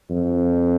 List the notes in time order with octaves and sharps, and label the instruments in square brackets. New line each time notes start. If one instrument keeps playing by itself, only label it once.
[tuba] F2